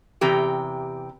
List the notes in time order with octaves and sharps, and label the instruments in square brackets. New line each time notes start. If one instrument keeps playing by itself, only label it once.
[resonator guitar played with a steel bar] E2 C3 E3 G4 A#5